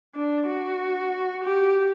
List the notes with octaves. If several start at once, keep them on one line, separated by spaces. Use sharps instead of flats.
D4
F#4
G4